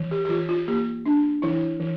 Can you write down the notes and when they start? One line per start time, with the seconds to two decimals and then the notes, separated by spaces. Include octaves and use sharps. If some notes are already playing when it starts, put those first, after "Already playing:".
Already playing: E3
0.11 G4
0.25 G4
0.29 E3 F4
0.49 F4
0.68 A#3 G4
1.06 D4
1.42 E3 E4
1.80 E3